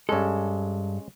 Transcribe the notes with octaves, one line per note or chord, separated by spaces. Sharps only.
G2 G#3 C#4 A4